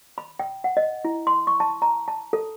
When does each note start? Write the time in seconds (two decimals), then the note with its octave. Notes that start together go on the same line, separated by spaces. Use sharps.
0.18 B5
0.39 G5
0.64 F#5
0.77 D#5
1.05 E4
1.27 C6
1.47 C#6
1.60 A5
1.82 A#5
2.08 A5
2.33 A4